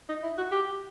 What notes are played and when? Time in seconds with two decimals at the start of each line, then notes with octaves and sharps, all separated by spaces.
0.09 D#4
0.23 E4
0.38 F#4
0.52 G4